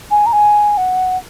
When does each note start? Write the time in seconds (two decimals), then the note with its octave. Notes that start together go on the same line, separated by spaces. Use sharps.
0.11 G#5
0.26 A#5
0.33 G#5
0.78 F#5